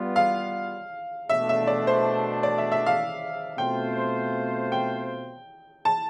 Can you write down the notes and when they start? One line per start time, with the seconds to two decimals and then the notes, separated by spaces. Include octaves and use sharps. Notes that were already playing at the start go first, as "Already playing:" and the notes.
Already playing: G3 B3 F4
0.16 F5
1.29 B2 A3 D4 E5
1.49 E5
1.68 D5
1.87 C5
2.43 D5
2.58 E5
2.72 E5
2.86 F5
3.58 B2 A3 C4 F4 C5 G5
4.72 G5
5.85 A5